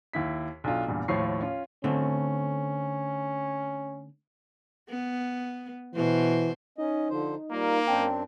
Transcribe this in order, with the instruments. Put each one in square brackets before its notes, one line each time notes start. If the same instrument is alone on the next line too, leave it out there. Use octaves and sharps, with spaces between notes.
[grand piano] D#2 E4 B6
B1 D4 F4
E2 G2 A#2
D#2 A2 F3 C#5 C#6 C7
C#4 F4
[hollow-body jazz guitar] D3 A3 C4 [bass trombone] C#4
[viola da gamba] B3
[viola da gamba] B2 C5 [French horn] E3
[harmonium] C#4 D#5 [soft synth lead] D#4
[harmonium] D3 F3 C5
[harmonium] G3 F4 A#4 [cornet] A#3
[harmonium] F#2 C4 D4 [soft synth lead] G5